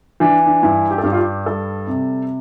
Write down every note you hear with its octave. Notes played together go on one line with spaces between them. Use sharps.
E3 D4
D4
G2 E4
G4
A4
G2 G4
F4
G4
G3 A4
C3